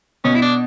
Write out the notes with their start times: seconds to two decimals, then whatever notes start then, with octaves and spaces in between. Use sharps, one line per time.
0.24 B2 C#4
0.35 E4
0.42 D4